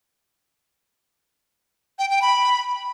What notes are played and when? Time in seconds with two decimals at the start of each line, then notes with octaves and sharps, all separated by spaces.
1.99 G5
2.10 G5
2.22 B5